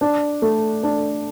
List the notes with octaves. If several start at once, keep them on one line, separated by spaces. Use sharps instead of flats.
D4
A3
D4